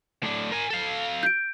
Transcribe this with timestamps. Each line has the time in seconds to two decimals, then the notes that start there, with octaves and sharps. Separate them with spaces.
0.23 A2 D4
0.52 A#4 G#5
0.70 A4 F5
1.23 G6 D7